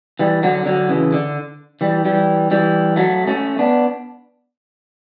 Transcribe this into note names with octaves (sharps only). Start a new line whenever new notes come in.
E3 G3
D3 F#3
D3 F#3
C#3 E3
D3
E3 G3
E3 G3
E3 G3
F#3 A3
A3 C#4
B3 D4